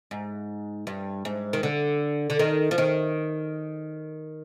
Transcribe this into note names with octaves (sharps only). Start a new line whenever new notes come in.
G#2
G2
G#2
D#3
D3
D3
D#3
F3
D#3